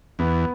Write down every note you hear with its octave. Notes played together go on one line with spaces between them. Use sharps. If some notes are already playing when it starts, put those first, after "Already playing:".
E2 B3